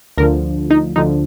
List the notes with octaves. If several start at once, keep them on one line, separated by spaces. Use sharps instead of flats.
D2 D3 F3 A#4
D#4
D2 D3 F3 D#4